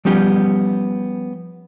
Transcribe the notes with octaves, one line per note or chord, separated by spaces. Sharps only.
F3 G3 B3 C#4 G4